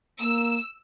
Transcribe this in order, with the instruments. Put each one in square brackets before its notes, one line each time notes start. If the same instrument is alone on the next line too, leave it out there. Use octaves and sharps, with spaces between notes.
[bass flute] A#3 [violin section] E6